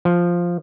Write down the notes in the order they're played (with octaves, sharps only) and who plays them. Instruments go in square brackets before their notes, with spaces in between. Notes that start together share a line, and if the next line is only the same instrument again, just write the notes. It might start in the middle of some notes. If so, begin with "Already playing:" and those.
[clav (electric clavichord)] F3